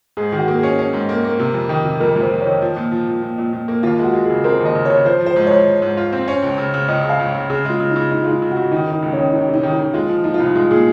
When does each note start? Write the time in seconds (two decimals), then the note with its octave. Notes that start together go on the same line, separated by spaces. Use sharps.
0.17 G#2 G#4
0.32 D#3
0.38 F#4
0.48 A#3
0.58 C#4 G#4
0.79 C#4
0.93 G#2
1.09 A#3
1.24 A#3
1.39 C3
1.54 F2
1.69 D#3
1.85 C3
2.00 F2 A#4
2.16 F2 C5
2.31 F2
2.41 C#5
2.46 D#3
2.62 F3
2.76 A#2
2.92 F3
3.07 A#2
3.22 A#2
3.38 A#2
3.53 A#2
3.68 A#3
3.83 D#2 F4
3.99 G#3
4.04 F#4
4.14 G#3
4.25 C#3 G#4
4.44 C4 A#4
4.60 D#2
4.65 D#5
4.75 C#3
4.85 C#3 C#5
5.05 F3 C5
5.21 F3
5.26 C5
5.36 G#2
5.47 G#2 C#5
5.66 F3
5.82 G#2
5.97 F4
6.12 C4
6.28 C#4
6.42 C#2
6.58 C#3
6.74 C#3
6.88 C#2 D#5
7.04 C#3
7.09 F5
7.19 C#2
7.34 C#3
7.50 C#3 G#4
7.65 G#3 F4
7.80 C#3
7.90 D#4
7.96 C#3
8.11 C#3 D#4
8.23 G#3 F4
8.31 D#4
8.42 C#3
8.51 F#4
8.57 C#3
8.71 D#3 D#4
8.87 D#3
8.92 D#4
9.02 C#2
9.13 D#3 C#4
9.33 C#2 D#4
9.49 C3 D#4
9.63 D#3
9.73 D#4
9.79 D#3
9.93 G#3 F4
10.09 F3
10.24 F3 D#4
10.34 F4
10.40 C2 D#4
10.55 G#3 F4
10.71 A#2 G#4